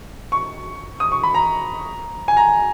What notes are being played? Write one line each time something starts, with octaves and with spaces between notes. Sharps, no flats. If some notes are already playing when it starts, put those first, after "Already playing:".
C#6
D#6
C#6
B5
A#5
G#5
A#5